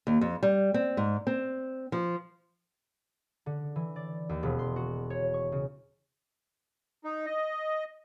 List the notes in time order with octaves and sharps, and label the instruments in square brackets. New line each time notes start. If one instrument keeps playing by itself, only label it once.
[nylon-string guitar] D#2
F2
G3
C4
G#2
C4
F3
[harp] D3
E3
D5
D#2
E1
C6
F#4
C#5
C#6
C#3
[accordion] D#4
D#5